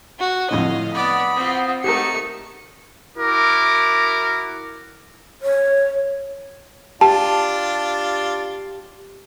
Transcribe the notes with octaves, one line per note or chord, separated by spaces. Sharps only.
F#4
F2 A2 D3 D#5 F5
B3 D5 F#5 B5 D#6
C4 F4
A3 D#4 G4 A#4 C#7
E4 F#4 A#4 D6
C#5
D4 F4 G4 A5